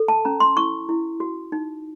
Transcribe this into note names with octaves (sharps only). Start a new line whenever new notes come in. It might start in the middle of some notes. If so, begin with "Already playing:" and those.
Already playing: A4
A5
C#4 A#5
C6
E4 C#6
E4
F#4
D#4